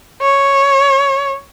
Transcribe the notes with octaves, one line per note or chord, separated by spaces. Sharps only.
C#5